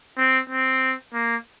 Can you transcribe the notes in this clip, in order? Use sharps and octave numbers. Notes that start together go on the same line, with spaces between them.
C4
C4
A#3